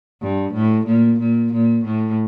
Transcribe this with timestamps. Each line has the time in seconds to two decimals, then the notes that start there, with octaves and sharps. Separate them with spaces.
0.22 G2
0.54 A2
0.87 A#2
1.20 A#2
1.53 A#2
1.85 A2